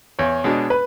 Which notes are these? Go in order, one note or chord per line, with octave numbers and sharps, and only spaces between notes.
E2 C#5
B2 G#3 D4
B4